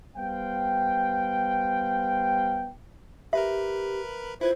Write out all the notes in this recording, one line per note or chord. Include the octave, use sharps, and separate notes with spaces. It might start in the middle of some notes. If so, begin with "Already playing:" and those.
G3 B3 C5 F5 G5
G4 A#4 B4 E5 B5
E4 F4 B4 C5 G#6